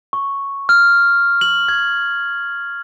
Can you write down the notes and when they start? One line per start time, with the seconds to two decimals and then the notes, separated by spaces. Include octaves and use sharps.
0.13 C#6
0.69 F6
1.41 F#7
1.68 G#6